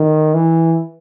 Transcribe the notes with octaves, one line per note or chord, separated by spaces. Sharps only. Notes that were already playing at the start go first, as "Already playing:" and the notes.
Already playing: D#3
E3